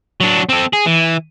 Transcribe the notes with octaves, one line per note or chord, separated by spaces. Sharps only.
F#3 D4
C4 A4
G#4
E3